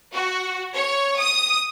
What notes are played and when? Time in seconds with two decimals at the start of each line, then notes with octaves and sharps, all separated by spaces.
0.14 F#4
0.74 C#5
1.19 D#6